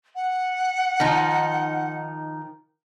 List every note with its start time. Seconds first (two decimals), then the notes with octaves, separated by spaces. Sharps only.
0.15 F#5
1.00 D#3 F3 D#4